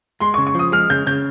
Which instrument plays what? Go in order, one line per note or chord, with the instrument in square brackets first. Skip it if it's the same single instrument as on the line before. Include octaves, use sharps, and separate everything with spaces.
[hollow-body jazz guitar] G#3 [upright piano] C6
[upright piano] C#6
[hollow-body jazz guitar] C#3
[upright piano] C#6
[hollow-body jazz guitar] F3 [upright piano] D#6
[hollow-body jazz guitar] G#3 [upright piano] F6
[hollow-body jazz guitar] C#3 [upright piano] G6
[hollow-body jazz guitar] C#3 [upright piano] G6